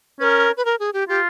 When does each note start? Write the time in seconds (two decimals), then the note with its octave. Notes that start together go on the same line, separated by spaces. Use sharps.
0.20 C#4 B4
0.24 A#4
0.57 B4
0.65 A#4
0.80 G#4
0.94 G4
1.09 F4 G4